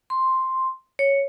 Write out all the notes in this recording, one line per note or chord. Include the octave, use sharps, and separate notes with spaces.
C6
C#5